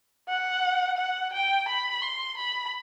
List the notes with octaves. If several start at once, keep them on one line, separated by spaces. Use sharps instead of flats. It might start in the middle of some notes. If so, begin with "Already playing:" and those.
F#5
F#5
G5
B5
C6
B5